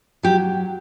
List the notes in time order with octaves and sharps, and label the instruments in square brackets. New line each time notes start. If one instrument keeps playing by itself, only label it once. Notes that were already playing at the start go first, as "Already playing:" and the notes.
[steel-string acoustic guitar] F#3 G4